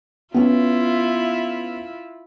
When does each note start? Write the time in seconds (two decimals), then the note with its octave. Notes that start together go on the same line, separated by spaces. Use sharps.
0.34 B3 C#4 E4 F4